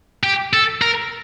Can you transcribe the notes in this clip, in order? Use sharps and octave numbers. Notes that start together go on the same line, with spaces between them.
G4
A4
A#4